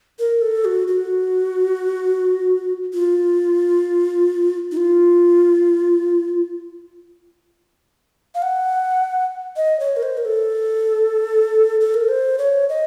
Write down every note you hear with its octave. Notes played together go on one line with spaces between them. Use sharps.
A#4
A4
F#4
F#4
F4
D#4
F4
F5
F#5
D#5
C#5
A#4
C5
A#4
A4
A4
A#4
C5
C#5
D#5